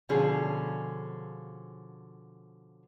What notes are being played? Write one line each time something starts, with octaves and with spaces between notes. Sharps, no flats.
B2 D3 F3 C#4 F4 G#4